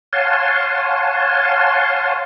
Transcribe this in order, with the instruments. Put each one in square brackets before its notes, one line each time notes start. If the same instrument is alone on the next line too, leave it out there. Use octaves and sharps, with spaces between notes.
[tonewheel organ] C#5 F5 F#5 G#5 A5 C6